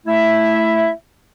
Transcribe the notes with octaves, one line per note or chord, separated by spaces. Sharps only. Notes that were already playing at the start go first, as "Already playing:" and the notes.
A3 E4 E5